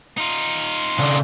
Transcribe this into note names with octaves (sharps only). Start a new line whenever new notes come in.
D#4 F4
C#3 D4